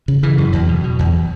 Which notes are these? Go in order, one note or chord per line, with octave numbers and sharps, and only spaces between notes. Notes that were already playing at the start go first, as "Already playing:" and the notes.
C#3
C#3 E3
F#2
E2 F#3
B2
B2
E2